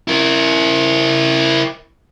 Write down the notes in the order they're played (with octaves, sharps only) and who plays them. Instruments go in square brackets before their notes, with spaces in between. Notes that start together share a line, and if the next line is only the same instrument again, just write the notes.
[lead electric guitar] E4 A#4